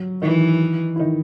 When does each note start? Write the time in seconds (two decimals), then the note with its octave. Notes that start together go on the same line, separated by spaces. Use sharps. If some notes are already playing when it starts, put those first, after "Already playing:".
Already playing: F#3
0.22 D#3 E3 D#4
0.96 E4
1.00 D#3 D#4